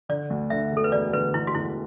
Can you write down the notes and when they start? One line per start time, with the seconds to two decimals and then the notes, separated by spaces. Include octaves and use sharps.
0.09 D3 D5
0.30 D2
0.50 D3 E5
0.72 E1
0.77 A4
0.84 B4
0.92 E1 D5
1.13 D3 B4
1.34 E1 E4
1.47 F#4
1.54 E1 E4